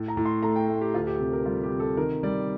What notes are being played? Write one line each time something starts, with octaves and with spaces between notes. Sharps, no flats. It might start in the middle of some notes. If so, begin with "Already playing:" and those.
Already playing: A2
A#5
A2
C6
A3 A#5
G5
A3
G4
D2 F4
G4
C3
A#4
G3 F4
G4
C3
A4
D#3 A#4
G3 D5